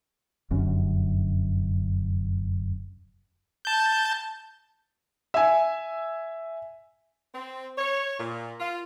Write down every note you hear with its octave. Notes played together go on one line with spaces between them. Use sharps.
F1 F#2 D3 C#4
A5 G6
E5 G#5
C4
C#5
A#2
F4